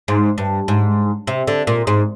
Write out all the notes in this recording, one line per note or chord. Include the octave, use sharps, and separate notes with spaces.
G#2
G2
G#2
C3
D3
A#2
G#2